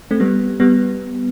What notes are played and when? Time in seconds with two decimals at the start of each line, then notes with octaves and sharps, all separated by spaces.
0.11 A3 C4
0.20 G3 B3
0.60 G3 B3